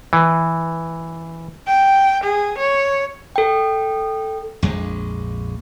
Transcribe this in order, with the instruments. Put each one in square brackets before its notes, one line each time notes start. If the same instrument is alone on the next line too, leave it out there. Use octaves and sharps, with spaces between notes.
[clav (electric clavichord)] E3
[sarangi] G5
G#4
C#5
[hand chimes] A4 G5
[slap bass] A#1 F2 G#3